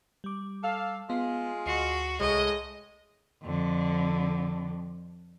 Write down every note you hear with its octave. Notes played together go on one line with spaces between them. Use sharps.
G3 D6
A4 F5
G#3 B3 F4
D2 F#4 D#5 C7
C2 A2 G#3 D#5 C#6
F2 D3